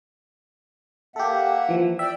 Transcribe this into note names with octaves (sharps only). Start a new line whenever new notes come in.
A#3 G4 A4 E5 F#5
E3 F3
D5 E5 G5